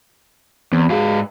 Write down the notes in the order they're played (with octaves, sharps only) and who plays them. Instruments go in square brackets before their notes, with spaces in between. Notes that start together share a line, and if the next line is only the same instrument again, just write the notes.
[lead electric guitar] E2 [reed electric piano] E3 B3 C4
[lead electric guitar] G#2 F5 [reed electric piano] F#4 G#4